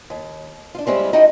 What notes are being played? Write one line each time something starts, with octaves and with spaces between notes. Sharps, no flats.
D#2
D4 F4
G3 G#3 C4 C#4 E4 G4
D#4 E4 F#4 A4 D#5 G5